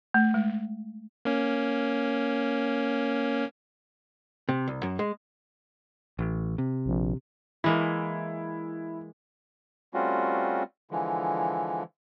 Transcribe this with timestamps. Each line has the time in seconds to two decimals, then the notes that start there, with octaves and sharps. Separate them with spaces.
0.14 A3
0.34 G#3
1.25 A#3 C#4
4.49 C3
4.68 C2
4.83 F#2
4.99 G#3
6.19 A1
6.58 C3
6.86 A#1
7.64 E3 G#3 A#3 E4
9.94 G3 A3 C4 C#4 F4 F#4
10.91 D3 E3 F3 G#3